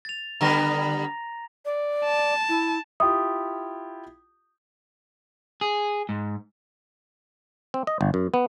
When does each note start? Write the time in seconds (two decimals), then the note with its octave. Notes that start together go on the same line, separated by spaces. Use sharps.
0.05 A6 F7
0.41 D3 G3 B3 A#5 A#6 F7
1.65 D5
2.04 A5
2.49 E4
3.00 E4 F4 G4 D#6
5.61 G#4
6.09 G#2
7.74 C4
7.87 D#5
8.01 G1
8.14 F#2
8.34 B3